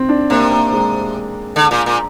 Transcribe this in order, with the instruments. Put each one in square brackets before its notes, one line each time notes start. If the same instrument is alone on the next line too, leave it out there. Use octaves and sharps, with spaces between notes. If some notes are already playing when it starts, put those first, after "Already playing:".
Already playing: [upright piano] C4
D4
[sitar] C3 [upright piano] A#3
[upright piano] A#3
G#3
[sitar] D3
A#2
A#2